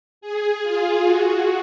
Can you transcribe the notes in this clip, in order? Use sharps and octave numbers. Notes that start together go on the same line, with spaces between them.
G#4
F4
F#4